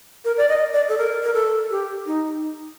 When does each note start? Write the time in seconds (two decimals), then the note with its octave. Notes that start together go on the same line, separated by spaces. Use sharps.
0.25 A#4
0.37 D5
0.49 D#5
0.73 D5
0.89 A4
0.98 A#4
1.23 A#4
1.34 A4
1.70 G4
2.06 D#4